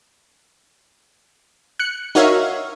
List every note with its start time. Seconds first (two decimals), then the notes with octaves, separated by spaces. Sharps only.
1.79 F#6 C#7
2.15 D#4 F#4 A#4 C#5 E5 F5